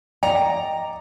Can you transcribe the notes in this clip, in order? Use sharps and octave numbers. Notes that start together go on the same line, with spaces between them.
D5 D#5 G5 A#5